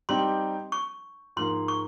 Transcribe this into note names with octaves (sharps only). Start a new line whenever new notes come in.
G3 C4 D#4 G4 C6
C#6
G#2 F3 A#3 C6
C#6